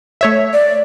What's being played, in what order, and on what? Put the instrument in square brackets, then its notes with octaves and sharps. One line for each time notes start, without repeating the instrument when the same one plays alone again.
[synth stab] A3 C#5 E5
[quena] D5